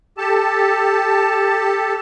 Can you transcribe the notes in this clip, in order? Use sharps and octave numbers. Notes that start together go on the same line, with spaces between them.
G4 A4 A5